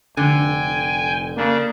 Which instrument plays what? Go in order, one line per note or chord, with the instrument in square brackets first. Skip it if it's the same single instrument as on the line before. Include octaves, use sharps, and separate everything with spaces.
[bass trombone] F1 [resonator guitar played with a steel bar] D3 [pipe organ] G5 [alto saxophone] G#5
[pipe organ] C#3 D4 [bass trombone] A#3